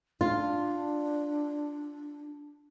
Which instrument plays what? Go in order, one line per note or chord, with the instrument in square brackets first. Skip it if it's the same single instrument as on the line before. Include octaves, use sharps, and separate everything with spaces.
[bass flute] D4 [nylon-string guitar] F4